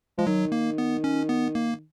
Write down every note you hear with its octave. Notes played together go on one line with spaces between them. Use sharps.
F3 G#3
D#3 F#3
A#3
B3
C#4
B3
A#3